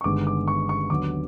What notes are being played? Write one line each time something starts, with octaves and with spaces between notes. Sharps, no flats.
C#6
G1 G2 D#3 G#3 B3 D6
D6
C#6
C#6
D#2 D3 F#3 B3 D6